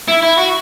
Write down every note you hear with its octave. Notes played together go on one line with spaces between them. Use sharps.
E4
E4
F#4